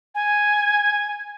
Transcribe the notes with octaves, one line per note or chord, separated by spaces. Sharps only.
G#5